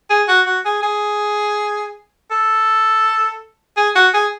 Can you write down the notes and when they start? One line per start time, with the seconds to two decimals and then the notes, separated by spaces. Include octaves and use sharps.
0.10 G#4
0.28 F#4
0.46 F#4
0.65 G#4
0.83 G#4
2.31 A4
3.77 G#4
3.95 F#4
4.14 G#4